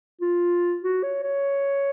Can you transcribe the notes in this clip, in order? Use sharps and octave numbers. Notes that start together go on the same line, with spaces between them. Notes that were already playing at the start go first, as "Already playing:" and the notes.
F4
F#4
C#5
C#5